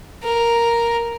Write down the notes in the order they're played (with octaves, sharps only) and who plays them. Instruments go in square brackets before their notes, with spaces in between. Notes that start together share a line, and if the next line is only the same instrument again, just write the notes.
[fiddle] A#4